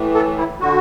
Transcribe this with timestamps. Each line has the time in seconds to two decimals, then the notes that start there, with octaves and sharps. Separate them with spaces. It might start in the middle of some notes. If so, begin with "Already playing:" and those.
Already playing: A2 E3
0.15 A4
0.37 E4
0.60 D3 F#4